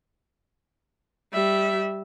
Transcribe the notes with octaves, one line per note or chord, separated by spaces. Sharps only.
G3 E5